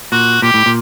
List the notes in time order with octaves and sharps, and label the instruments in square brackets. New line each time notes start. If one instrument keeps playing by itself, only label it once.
[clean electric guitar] A#2 [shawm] F#4
[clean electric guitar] A#2 [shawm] G4
[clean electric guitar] A2
A#2